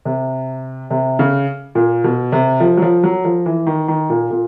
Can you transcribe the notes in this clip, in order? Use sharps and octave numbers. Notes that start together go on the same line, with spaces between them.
C3
C3
C#3
A#2
B2
C3
F3
F#3
F3
F#3
F3
E3
D#3
D#3
A#2
A#2